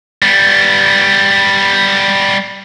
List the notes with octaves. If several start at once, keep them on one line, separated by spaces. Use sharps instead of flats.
G3 B3